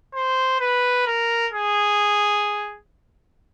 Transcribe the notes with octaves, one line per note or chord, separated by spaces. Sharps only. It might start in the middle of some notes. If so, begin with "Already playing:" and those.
C5
B4
A#4
G#4